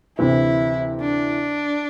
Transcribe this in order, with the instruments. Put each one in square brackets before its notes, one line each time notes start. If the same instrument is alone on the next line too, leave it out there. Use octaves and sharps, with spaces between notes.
[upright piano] D2 C3 E3 [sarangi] E4
[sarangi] D4